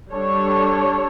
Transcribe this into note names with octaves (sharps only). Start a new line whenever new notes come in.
G3 D4 A4 C#5